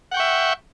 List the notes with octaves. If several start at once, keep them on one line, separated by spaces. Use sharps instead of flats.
E5 F#5 G5 C#6